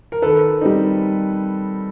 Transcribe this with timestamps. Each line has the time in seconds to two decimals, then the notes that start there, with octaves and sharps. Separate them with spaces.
0.12 A#4
0.22 D#3 A4 B4
0.61 G3 C4 D#4